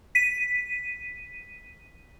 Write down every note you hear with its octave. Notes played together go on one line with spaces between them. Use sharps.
B6 D#7